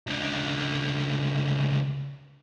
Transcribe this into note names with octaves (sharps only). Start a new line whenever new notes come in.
C#2 D3